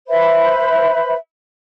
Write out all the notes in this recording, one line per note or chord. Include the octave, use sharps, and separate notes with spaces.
B4 C5 E5 B5